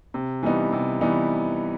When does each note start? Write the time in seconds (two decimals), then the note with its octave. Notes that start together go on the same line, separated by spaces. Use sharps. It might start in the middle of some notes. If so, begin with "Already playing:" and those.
0.14 C3
0.43 E3 G3 B3 D#4
0.73 C3
1.01 E3 G3 B3 D#4